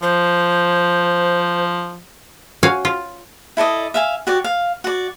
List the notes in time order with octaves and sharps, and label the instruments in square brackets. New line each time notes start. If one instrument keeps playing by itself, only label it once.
[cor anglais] F3 [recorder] C5
[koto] F#4 C#5 F5 G#5
F4
[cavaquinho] E4 A4 D5 D#5
E5 F5 G#5
F#4 G4 D5
F5
F#4 D5